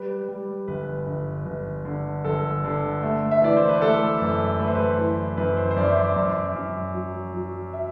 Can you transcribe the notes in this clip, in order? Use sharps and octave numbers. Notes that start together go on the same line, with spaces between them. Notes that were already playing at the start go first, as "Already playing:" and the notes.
Already playing: G3 B4
G3
G1 B4
G1
G1
D3
G1 A4
D3
A3
E5
E3 D5
C5
B4
A3 A4
F#2
A3 B4
C5
B4
E3
F#2 B4
C5
C5
F#2 D5
E5
D5
F#2
F#2
F#3
F#3
E5